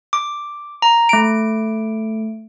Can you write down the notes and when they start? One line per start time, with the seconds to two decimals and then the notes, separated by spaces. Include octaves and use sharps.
0.13 D6
0.82 A#5
1.09 A3 D7